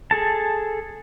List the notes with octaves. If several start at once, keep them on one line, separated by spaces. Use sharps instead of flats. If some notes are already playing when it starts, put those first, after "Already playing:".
G#4 A4 A5